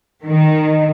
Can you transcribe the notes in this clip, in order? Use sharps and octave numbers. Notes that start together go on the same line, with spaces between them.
D#3